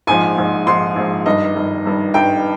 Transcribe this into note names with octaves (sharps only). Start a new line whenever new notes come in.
A#1 G#2 F3 G#5
A#1 G#2 F3
A#1 G#2 F3 C6
A#1 G#2 F3
G1 G2 D#3 D#5
G1 G2 D#3
G1 G2 D#3
G1 G2 D#3 G5